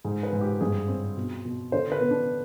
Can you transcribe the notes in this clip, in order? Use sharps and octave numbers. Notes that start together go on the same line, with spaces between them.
G#2 G#4
B4
G#2
G4
G2 G#4
C4
B2
B2
D3 C5
B4
B3
D4